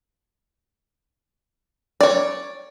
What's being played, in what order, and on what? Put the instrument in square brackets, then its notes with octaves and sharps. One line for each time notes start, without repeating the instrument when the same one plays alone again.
[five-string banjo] C#5 D5